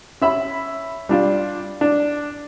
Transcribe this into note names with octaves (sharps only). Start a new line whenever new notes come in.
C#4 E5 B5
G3 D4 F4
D4